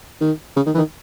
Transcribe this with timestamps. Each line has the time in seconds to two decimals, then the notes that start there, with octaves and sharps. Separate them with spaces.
0.21 D#3
0.56 C#3
0.66 D#3
0.74 E3
0.78 D#3